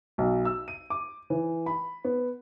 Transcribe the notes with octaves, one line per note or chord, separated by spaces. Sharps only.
B1
E6
D#7
D6
E3
B5
B3